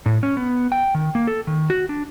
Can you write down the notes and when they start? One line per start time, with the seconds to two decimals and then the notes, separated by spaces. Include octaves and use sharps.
0.06 A2
0.23 C#4
0.37 B3
0.72 G5
0.95 D#3
1.15 A#3
1.27 A4
1.47 D#3
1.70 F#4
1.89 D4